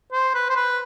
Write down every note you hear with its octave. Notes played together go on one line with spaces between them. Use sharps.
C5
B4
C5
B4